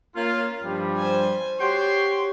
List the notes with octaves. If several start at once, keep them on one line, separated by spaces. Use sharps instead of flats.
A#3 C#4 F4
G2 F3 G3
C5 G#5
F#4 G4 C#5 G5 C6